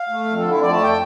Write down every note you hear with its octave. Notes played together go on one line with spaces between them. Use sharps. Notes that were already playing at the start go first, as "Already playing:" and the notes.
Already playing: F5
A3
F2
D3 A4
F2 E4
D5
A3 A5
G5